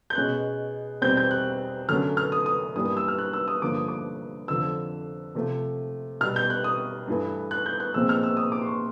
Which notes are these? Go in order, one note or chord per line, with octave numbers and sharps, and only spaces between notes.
G6
B2 G#3 C#4 F#6
E2 B2 G3 C4 G6
G6
F#6
F#2 D3 F#3 A3 C#4 F6
F6
D#6
D#6
G2 E3 G3 A#3 D#6
D#6
E6
F6
F#6
E6
D#6
G2 D3 F3 A#3 D6
D#6
D6
F2 D3 F3 E6
C3 F3 A3
B2 G3 B3 F6
G6
F#6
D#6
G2 E3 A3
F#6
G6
F#6
A#2 F3 G#3 C4 E6
F6
E6
D#6
D6
C6
C#6